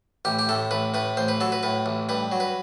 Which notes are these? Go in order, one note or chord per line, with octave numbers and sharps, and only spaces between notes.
A1 G4
G4
A2 A4
A1 B4
A2 B4
A1 C5
B4
F#3 A4
B4
A2 B4
A1
G2 B4
F#3
B4